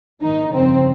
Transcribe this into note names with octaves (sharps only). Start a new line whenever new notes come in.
A#1 G#2 D#3 D#4
G1 F2 C#3 F3 C4